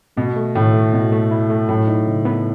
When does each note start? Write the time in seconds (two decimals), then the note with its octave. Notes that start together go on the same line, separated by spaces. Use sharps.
0.17 B2 A3
0.36 A3
0.55 A2 D#3
0.74 A3
0.92 B2 E4
1.12 A3
1.31 E4
1.50 A3
1.69 A2 F#3
1.88 D#4
2.07 C#3
2.25 B3